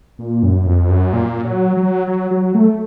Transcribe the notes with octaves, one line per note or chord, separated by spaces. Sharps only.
A#2
F#2
F2
F#2
A#2
F#3
F#3
F#3
F#3
A3